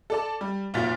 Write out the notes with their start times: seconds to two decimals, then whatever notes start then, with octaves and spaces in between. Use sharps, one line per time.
0.10 A4 D5 A5
0.41 G3
0.74 F1 A#2 F4 F#4 A6 B6